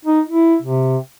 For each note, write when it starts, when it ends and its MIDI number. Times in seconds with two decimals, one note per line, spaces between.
0.05 0.21 63
0.29 0.55 64
0.62 0.97 48